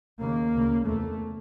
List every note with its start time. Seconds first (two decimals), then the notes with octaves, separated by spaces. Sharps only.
0.21 D#2 C#3 A#3
0.54 D2 C#3
0.85 E2 C3 A3